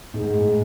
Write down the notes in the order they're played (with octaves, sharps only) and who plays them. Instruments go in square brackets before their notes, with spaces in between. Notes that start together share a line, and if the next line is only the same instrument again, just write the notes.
[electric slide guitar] A2 [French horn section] G#3 B3 D#4 G#4
[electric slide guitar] G#2
A2